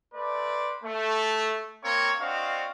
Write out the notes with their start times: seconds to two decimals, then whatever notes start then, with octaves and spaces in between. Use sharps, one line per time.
0.14 A3 B4 C5 D5
0.84 A3
1.83 A#3 C4 C#5 A#5 C#6
2.20 C4 D4 F#4 D#5 F5